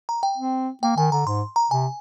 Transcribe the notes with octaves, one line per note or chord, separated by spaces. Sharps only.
A#5
G5
C4
A#3 G5
D#3 G#5
D3 A#5
G#2 C6
A#5
C3 G#5